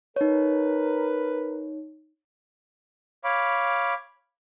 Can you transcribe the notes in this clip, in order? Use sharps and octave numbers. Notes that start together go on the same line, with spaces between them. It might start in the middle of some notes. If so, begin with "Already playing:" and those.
D#4 A#4 B4 C#5
C#5 F5 B5 D6